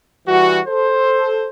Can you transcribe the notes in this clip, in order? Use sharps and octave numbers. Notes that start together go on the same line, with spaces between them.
E3 G3 F#4
A4 C5